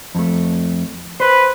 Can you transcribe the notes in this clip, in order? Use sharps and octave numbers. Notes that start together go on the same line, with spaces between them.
F2 A3
B4 C5